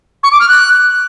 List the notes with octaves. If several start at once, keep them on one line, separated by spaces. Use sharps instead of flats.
C#6
D6
F6
F#6